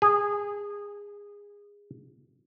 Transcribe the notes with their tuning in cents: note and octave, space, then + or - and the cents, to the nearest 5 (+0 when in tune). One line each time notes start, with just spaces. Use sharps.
G#4 -25